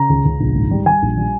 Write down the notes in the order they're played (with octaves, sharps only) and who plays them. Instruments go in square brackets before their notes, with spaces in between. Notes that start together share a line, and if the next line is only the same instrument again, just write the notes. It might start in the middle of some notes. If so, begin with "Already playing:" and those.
Already playing: [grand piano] C#3 A#5
C#2
C#2
A#1
G#2
G3
G3 G#5
A#1
G3